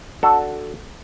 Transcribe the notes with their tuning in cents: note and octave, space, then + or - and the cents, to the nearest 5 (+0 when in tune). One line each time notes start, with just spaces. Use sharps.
D4 +0 F#4 +0 A4 +0